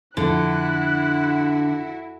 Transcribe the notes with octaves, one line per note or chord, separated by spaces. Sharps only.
F2 D3 E4 F#4 F#6